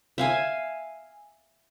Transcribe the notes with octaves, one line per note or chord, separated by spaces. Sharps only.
E5 F5 G#5